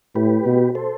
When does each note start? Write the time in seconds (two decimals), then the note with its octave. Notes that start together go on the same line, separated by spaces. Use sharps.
0.15 A2 G4 B4
0.46 B2
0.75 A4 C5